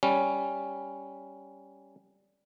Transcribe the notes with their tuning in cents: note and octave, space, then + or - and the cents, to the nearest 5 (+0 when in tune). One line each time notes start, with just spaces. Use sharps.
G3 +0 C#4 +0